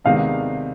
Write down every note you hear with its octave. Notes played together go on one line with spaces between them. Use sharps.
C3 D#3 G#3 B3 D4 F5